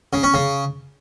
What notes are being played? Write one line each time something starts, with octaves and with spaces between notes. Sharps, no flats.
C#3
C#4
C#3